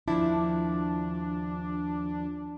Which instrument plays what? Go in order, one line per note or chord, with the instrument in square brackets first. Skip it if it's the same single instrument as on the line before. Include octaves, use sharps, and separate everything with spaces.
[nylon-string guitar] D#2 F3 E4 [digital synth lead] D4